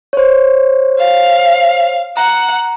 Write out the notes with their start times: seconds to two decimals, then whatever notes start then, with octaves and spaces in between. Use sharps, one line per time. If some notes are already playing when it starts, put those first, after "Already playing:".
0.13 C5 C#5
0.99 F5
2.17 F#5 A#5